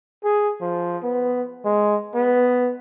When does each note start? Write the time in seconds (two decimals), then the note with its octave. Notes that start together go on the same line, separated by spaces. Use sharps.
0.24 G#4
0.61 F3
1.03 B3
1.65 G#3
2.15 B3